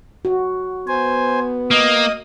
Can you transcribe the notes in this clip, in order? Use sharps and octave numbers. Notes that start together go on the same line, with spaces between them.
F#4
B3 C5 G#5
A#3 D#5 D#6